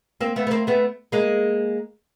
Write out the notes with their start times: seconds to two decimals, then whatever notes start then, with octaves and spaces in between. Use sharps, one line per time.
0.21 A#3 C4
0.36 A3 B3
0.47 B3
0.51 A#3 C4
0.67 A3 B3
1.12 G#3 A#3